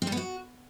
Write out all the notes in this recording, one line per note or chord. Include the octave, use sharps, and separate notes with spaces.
C4
G3
B3
F#4